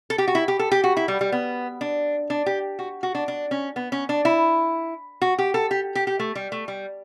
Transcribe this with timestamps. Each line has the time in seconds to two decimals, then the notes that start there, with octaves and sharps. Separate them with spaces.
0.10 A4
0.18 G4
0.28 F#4
0.35 E4
0.48 G4
0.59 A4
0.72 G4
0.84 F#4
0.97 E4
1.08 G3
1.21 G3
1.32 B3
1.81 D4
2.30 D4
2.46 G4
2.79 F#4
3.03 F#4
3.15 D4
3.28 D4
3.51 C#4
3.76 B3
3.92 C#4
4.09 D4
4.25 E4
5.22 F#4
5.39 G4
5.54 A4
5.71 G4
5.95 G4
6.07 G4
6.19 A3
6.35 G3
6.52 A3
6.68 G3